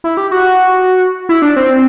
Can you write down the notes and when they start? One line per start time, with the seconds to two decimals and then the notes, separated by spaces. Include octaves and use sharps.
0.04 E4
0.17 G4
0.31 F#4
1.29 E4
1.42 D4
1.56 C4